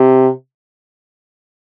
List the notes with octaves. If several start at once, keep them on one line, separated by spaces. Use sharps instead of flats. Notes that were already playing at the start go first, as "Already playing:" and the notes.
Already playing: C3